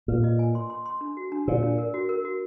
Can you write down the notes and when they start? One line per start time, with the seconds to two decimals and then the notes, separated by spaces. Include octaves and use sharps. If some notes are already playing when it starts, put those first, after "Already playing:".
0.08 A#2 B4
0.24 D#5
0.39 G#5
0.55 C6
0.70 C6
0.86 C6
1.01 D4
1.17 F#4
1.32 D4
1.48 A#2 A#4
1.63 D4
1.78 A#4
1.94 F#4
2.09 A#4
2.25 F#4